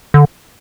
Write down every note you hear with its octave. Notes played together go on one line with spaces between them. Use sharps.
D3